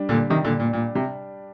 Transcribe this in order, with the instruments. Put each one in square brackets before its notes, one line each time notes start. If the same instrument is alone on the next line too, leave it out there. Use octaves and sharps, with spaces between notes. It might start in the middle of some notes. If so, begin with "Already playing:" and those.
Already playing: [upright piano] G3 D4
[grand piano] A#2 D3
C3 D#3
A#2 D3
A#2
A#2
C3